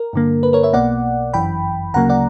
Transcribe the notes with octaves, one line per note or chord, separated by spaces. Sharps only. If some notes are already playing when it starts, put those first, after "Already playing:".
Already playing: A#4
G2 D3 A#3
B4
A#4 C#5
C#5 E5
B1 B2 A#3 D5 F#5
G1 F#2 E3 G5 B5
D2 C#3 F#3 A#3 F#5 A#5
D5 F#5